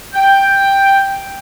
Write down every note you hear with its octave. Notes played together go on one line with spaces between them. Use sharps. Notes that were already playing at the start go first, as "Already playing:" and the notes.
G5